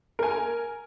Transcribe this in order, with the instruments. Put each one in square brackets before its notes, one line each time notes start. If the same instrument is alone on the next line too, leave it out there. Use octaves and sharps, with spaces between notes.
[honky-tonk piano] A#4 G#5